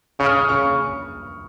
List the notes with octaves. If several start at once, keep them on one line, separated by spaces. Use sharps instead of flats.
C#3 C#6
F6
D#6
F6
C#3 C#6